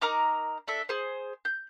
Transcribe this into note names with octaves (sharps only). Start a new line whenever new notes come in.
D#4 A#4 A#5 D6
D4 A4 E5
G#4 C5
G6